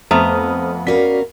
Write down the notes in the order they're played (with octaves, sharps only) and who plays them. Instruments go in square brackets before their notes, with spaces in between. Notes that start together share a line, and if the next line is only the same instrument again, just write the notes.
[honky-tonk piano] F2 [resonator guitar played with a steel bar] A3 B3 A#5 [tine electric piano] C5 D#6 F6
[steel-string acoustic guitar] C#4 A#4 F5 [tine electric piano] F#4 D5 B6